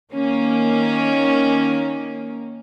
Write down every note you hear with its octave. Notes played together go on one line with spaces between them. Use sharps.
D#3 A#3 C#4